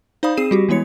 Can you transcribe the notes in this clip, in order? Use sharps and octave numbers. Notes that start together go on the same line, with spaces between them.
D#4 C5 D5 F5 B5 D#6
C4 G#4 C7 D#7 E7
G3 F#4 G4
E3 G#3 B3 E4 C#5 C#7